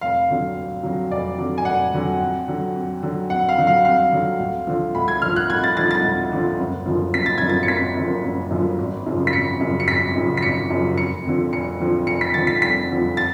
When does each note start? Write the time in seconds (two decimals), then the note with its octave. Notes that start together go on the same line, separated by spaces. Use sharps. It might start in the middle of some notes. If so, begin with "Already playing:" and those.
0.01 F1 F5
0.28 F2 D3 F#3
0.56 F1
0.83 F2 D3 F#3
1.11 F1 D5
1.38 F2 D3 F#3
1.58 G#5
1.65 F1 F#5
1.93 F2 D3 F#3
2.20 F2
2.48 D3 F#3
2.75 F2
3.03 D3 F#3
3.30 F2 F#5
3.49 F5
3.58 D3 F#3
3.67 F5
3.85 F2 F5
4.13 D3 F#3
4.39 D2
4.67 D3 F3
4.95 D2 B5
5.08 G#6
5.22 D3 F3 F6
5.36 F#6
5.49 D2 G#6
5.64 A6
5.77 D3 F3 A6
5.91 A6
6.04 D2
6.32 D3 F3
6.59 F#1
6.86 F#2 D3 F3
7.14 F#1 B6
7.26 A6
7.38 F#2 D3 F3 G#6
7.49 A6
7.63 C#7
7.68 F#1 B6
7.97 F#2 D3 F3
8.24 F#1
8.51 F#2 D3 F3
8.78 G#1
9.06 F#2 C#3 F3
9.27 B6
9.33 G#1 C#7
9.61 F#2 C#3 F3
9.80 C#7
9.88 G#1 B6
10.15 F#2 C#3 F3
10.37 B6
10.43 G#1 C#7
10.70 F#2 C#3 F3
10.98 F1 C#7
11.25 F2 D3 F3
11.52 F1 C#7
11.80 F2 D3 F3
12.07 F1 C#7
12.21 B6
12.34 F2 D3 F3 A6
12.47 B6
12.62 F1 B6
12.90 F2 D3 F3
13.17 A6